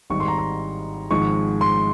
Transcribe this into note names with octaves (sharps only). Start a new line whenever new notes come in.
G#1 G#2 G3 C#6
C6
A#5
C6
G#1 G#2 F3 G#3 C#6
C6